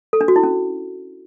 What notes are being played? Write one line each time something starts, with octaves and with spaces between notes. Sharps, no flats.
A4
D4
F#4
E4
C#4